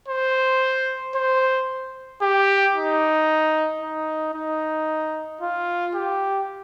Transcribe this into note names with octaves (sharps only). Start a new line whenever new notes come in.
C5
C5
G4
D#4
D#4
D#4
F4
G4